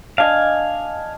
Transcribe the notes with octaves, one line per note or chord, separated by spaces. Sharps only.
D4 D#5 F5 G#5